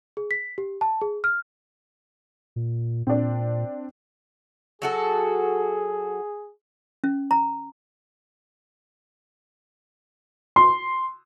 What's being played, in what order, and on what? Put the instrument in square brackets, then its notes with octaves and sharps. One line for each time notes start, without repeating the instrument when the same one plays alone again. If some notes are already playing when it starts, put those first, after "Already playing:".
[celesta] G#4
B6
G4
A5
G#4
F6
[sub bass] A#2
[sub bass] A#2 [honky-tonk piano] C4 D4
[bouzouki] F#3 F#4 A4 [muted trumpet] G#4
[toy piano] C#4
A#5
[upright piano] C6